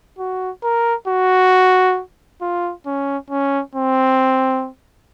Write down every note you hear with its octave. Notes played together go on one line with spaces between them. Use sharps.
F#4
A#4
F#4
F4
C#4
C#4
C4